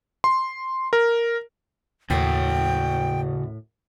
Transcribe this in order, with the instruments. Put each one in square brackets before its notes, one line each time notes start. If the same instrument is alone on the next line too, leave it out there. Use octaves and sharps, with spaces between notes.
[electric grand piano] C6
A#4
[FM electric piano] D#2 [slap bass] A2 [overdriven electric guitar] C#3 F#4 [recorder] G5